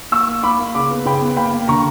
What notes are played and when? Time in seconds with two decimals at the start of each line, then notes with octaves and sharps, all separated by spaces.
0.12 A#3 C#6 E6
0.27 A#3
0.43 A#3 B5 D6
0.59 A#3
0.75 C#3 B5 D6
0.90 B3
1.05 C#3 G5 B5
1.21 B3
1.37 A#3 G5 B5
1.53 A#3
1.68 D3 A#5 C#6